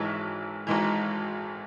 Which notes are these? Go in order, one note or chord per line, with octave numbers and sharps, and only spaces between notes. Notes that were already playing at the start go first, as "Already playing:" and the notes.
Already playing: G#1 G#2 E3 C#5 E5
G#1 G#2 E3